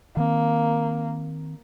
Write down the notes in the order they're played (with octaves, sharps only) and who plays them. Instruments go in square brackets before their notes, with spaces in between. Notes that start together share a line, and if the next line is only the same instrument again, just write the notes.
[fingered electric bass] D#3 C4 [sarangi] A#3